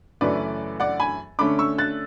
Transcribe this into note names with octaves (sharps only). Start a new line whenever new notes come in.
F#2 C#3 E3 A3 C#4 B4 D5
D5 F#5
G#5 B5
D3 A3 C#4 B5 D6
C#6 E6
F#6 A6